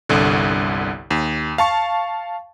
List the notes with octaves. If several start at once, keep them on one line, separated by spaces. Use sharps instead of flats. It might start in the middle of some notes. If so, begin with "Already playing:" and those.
G1 C2 D3
D#2
F5 A5 C#6